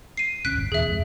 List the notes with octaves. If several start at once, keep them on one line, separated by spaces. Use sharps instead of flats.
C7 D#7
D1 C#4 F#6 B6 D7
G1
E1 E2 G#4 E5
F2 G#2 C3